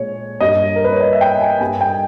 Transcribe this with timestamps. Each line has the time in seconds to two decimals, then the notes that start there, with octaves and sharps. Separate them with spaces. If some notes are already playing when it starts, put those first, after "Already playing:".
Already playing: A#2 G#3 C#5
0.41 G2 G3 A#3 D#5
0.76 A#4
0.84 B4
0.92 C#5
1.01 D#5
1.13 E5
1.21 G5
1.41 G#5
1.60 G2 G3 A#3 G#5
1.81 G5